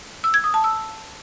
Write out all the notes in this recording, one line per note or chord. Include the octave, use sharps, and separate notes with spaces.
E6
G#6
D#6
A5
E6